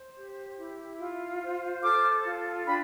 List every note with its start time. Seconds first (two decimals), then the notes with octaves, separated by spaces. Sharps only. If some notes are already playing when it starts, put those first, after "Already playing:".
Already playing: C5
0.15 G4
0.58 E4
0.99 F4
1.41 C5
1.82 A4 D6 F6
2.24 F4
2.66 D4 G5 B5